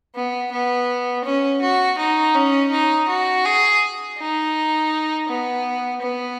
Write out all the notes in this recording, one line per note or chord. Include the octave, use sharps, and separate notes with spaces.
B3
B3
C#4
F#4
D#4
C#4
D#4
F#4
G#4
D#4
B3
B3